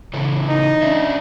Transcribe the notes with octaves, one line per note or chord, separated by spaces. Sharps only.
C#3 E3 A4
D#4
C#4 D4 E5